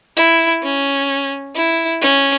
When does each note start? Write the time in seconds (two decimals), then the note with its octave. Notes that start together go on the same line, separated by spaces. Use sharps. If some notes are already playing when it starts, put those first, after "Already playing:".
0.16 E4
0.63 C#4
1.56 E4
2.02 C#4